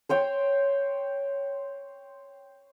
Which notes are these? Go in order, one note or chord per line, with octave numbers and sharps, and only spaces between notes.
C5 C#5 G5